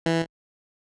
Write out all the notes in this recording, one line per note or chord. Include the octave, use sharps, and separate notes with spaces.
E3